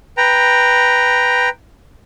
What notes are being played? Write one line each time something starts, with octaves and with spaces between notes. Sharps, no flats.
B4 G5 A#5